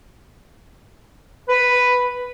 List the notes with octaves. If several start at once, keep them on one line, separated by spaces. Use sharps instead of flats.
B4